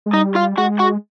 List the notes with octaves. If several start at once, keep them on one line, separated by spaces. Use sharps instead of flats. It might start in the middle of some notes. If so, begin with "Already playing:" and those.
G#3
G3 D#4 D#5
F4 F5
G#3 F#4 F#5
F#4 F#5